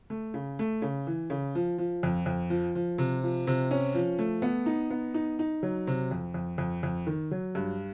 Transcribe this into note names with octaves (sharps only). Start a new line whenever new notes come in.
A3
C#3
A3
C#3
E3
C#3
F3
F3
F2
F2
F3
F3
C3
F3
C3
C#4
F3
A3
B3
D#4
B3
D#4
D#4
F#3
C3
F2
F2
F2
F2
D#3
F#3
G2